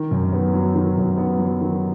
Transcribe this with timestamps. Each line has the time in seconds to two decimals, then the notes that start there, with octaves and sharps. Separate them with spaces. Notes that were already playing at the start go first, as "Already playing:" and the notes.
Already playing: D#3
0.11 F#2
0.33 B3
0.54 F#3
0.75 D#3
0.97 F#2
1.17 B3
1.39 F#3
1.61 D#3